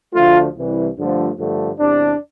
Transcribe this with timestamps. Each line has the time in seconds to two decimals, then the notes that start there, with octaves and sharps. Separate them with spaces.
0.14 D2 D3 F3 A3 F4
0.55 C2 C3 E3 G3
0.97 G2 D3 F3 A3
1.39 G2 D3 F3 A3
1.79 E2 C3 G3 D4